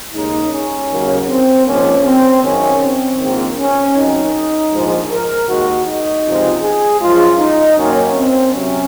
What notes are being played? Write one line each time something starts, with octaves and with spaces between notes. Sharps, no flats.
D#2 C#3 G#3 D#4
C#4
D#2 C#3 F#3 A#3
C4
A#1 G#2 F3 A#3 C#4
C4
G#1 F#2 D#3 C#4
C4
A#1 G#2 D#3 A#3
C#4
G#1 F#2 D#3 D#4
A#1 G#2 F3 G#3
A#4
D#2 D#3 G#3 F#4
D#4
C#2 C3 F3 G#3
G#4
F#2 F3 G#3 F4
D#4
F#2 D#3 F#3 A#3 C#4
C4
C3 F#3 C#4